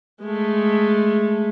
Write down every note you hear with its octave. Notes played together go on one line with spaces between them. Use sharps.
G#3 A3